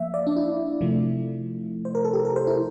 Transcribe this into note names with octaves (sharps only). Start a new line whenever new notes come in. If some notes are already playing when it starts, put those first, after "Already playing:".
Already playing: F3 A#3 E5 F5
D5
D4
E4
C3 F3 A3
C5
A#4
A4
G4
A#4
C5
E4